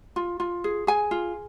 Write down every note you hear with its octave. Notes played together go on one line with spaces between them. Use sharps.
F4
F4
G#4
G#4 G#5
F4